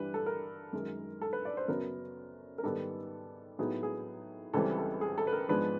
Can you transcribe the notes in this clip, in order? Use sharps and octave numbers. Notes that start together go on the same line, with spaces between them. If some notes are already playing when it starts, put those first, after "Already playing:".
Already playing: G2 E3 G3 B4
A4
A#4
F#2 D#3 G#3
A4
B4
D5
C5
F#2 C#3 F#3 B3 A#4
A#4
G#2 D#3 G3 B3 A4
A2 F#3 B3 D#4 G#4
G#4
C#2 C#3 E3 G3 C4 A4
A4
G#4
A4
B4
A#4
G#2 F3 G#3 B3 D4 B4